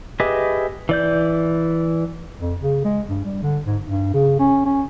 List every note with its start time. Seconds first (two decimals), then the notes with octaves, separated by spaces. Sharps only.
0.20 G4 G#4 B4 D#5 E5
0.89 E3 D5 G6
2.41 F2
2.60 C#3
2.85 G#3
3.09 G2
3.25 G3
3.42 D3
3.66 G#2
3.83 G2
4.13 C#3
4.39 C#4
4.65 C#4